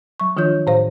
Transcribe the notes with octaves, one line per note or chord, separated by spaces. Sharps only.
F#3 C#6
D#3 F3 D4 F4 C#5 G6
A2 C5 F5